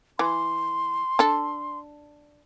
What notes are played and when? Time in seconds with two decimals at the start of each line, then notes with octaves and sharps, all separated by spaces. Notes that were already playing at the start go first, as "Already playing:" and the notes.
0.19 E3 C6
1.19 D4 A4